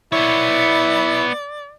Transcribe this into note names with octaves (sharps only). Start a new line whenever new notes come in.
B3 E4 C#5 D5